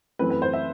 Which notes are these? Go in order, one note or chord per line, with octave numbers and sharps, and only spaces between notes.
F#2 E3 A3 C4 B4
B4
C5
E5